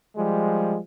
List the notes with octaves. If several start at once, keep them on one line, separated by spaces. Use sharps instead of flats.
F3 G3 G#3